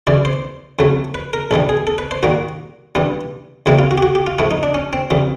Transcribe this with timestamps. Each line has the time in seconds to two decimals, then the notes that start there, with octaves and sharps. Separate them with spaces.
0.07 F#2 C#3 E3 D5
0.25 C5
0.79 F2 C#3 F#3 A3
1.14 B4
1.33 A#4
1.51 A#1 G#2 E3 G3 A4
1.69 G#4
1.87 A4
1.98 B4
2.11 C5
2.23 G#2 D#3 G3 A#3 F#4
2.95 G2 E3 G3 B3
3.66 C#2 C3 E3 G3 A#3 E4
3.79 F4
3.91 F#4
3.98 G4
4.03 F#4
4.15 G4
4.27 F4
4.39 G#2 F3 A3 E4
4.51 D#4
4.63 D4
4.74 C#4
4.93 C4
5.11 F2 C#3 E3 G3